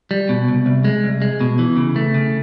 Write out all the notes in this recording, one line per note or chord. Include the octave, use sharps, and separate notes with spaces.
G3
B2
C2
C2
G#3
C2
G#3
B2
E3
C#3
A3
C#3